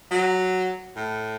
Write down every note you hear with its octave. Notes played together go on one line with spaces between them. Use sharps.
F#3
A2